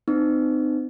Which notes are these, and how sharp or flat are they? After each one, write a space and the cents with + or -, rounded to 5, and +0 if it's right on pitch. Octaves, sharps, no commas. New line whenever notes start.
C4 -40 D#4 -35